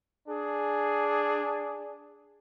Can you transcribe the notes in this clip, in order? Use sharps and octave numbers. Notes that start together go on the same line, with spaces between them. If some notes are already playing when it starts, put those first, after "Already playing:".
D4 G#4